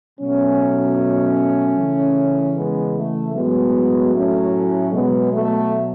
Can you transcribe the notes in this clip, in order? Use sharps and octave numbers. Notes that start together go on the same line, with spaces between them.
B2 F#3 A3 C#4
C#3 E3
G#3 B3
A3
A2 F#3 G#3 B3
A3 C#4
B2 F#3 G#3 B3
A3